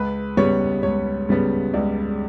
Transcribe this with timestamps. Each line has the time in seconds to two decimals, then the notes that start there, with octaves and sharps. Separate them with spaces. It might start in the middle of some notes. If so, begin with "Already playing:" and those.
Already playing: C#2 B4
0.37 C#3 G3 B3 C#5
0.83 C#2 C#5
1.29 C#3 G3 B3
1.74 C#2 D5